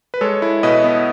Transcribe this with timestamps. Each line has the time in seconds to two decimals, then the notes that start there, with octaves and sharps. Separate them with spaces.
0.14 B4
0.21 G#3 A4 C#5
0.42 E4
0.63 B2 B4 D#5
0.84 B3